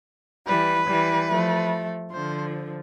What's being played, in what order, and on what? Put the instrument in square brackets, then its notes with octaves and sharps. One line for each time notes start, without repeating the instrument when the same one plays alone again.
[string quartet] E3 G3 [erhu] B4
[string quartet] E3 G3
F3 A3
[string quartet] D3 F3 [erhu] C5